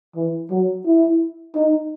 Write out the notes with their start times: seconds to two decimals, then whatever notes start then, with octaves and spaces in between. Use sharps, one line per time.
0.16 E3
0.50 F#3
0.86 E4
1.55 D#4